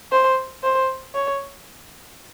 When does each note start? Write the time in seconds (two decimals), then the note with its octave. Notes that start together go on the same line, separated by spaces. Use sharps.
0.12 C5
0.64 C5
1.14 C#5